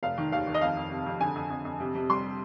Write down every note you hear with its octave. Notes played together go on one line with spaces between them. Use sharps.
F1 F5
D#3
D#2 F5
D#3
D#5
F2 F5
F2
C3
F2
D3 G#5
F2
F2
F2
C3
C3
G3 C6